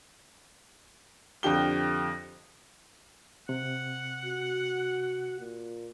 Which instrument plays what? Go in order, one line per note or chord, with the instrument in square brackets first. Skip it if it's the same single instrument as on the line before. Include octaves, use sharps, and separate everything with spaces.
[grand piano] F2 D3 G4 G7
[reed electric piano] C3 [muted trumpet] F#5
[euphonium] F#4
A#2